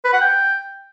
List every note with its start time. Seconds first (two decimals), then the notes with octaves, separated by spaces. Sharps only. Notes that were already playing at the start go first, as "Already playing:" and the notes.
0.05 B4
0.13 F#5
0.22 G5